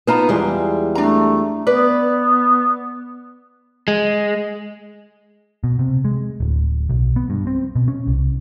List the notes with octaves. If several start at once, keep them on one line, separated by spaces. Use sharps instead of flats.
B3 D#4 F4 A5 A#5
E2 G3 G#3
A3 D4 A#5
B3 B4 D5
G#3
B2
C3
G#3
D1
B1
B3
G2
C4
B2
C#4
C2